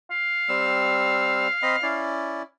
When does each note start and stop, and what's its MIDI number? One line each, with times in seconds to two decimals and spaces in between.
0.11 2.06 77
0.49 1.48 55
0.49 1.48 60
0.49 1.48 88
1.62 1.76 60
1.62 1.76 75
1.62 1.76 83
1.83 2.42 61
1.83 2.42 64
1.83 2.42 74